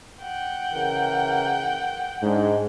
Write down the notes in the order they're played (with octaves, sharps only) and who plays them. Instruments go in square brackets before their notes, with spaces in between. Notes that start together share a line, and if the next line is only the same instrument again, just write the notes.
[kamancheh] F#5 G5
[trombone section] C#3 E3 A#4
[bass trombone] G#2 [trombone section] G#3 D4